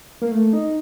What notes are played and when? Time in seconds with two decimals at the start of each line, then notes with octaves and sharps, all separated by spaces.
0.22 A#3
0.32 A3
0.53 D#4